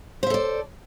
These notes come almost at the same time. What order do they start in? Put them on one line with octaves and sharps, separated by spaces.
C5 E5 A4 D5